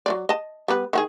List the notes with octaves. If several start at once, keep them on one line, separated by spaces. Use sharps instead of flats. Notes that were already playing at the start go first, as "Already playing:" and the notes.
F#3 A3 D5
D#5 A5
G3 B3 B4
D#3 F#4 G#4